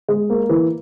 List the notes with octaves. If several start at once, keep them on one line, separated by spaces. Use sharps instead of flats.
G#3
A#3
E3